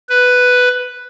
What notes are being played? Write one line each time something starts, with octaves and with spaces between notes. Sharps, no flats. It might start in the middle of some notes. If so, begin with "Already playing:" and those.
B4